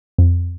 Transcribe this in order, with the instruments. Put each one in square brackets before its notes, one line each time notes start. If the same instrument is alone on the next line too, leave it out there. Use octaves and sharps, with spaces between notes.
[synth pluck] F2